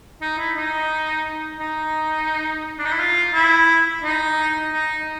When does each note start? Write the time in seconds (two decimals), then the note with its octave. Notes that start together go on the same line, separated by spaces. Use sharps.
0.21 D#4
0.38 E4
0.56 D#4
1.60 D#4
2.78 D4
2.85 D#4
2.92 E4
2.99 F4
3.34 E4
4.03 D#4
4.73 D#4